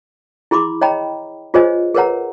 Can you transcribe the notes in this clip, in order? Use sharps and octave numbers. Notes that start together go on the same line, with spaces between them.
E4 G#4 B5 C6 D6
C#5 D#5 G5 A#5 B5
F4 G#4 C5 C#5 D#5 G#5
G#4 A#4 B4 C#5 F#5 A#5